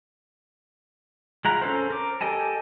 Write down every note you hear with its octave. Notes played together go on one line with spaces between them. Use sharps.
G#3 E4 F4 F#5 A#5
C#4 A4 C5
A#4 D6
G4 A4 D#5 G#5 A5